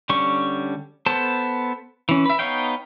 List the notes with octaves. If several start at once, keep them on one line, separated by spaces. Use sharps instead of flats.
D3 G3 C#4 C#6
B3 A4 C5 A5
E3 C#4
B4 E5
B3 D#4 C#5 F5 G5